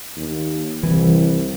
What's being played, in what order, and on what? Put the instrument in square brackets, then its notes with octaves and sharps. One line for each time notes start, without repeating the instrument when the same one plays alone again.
[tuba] D#2
[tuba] C2 [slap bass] E3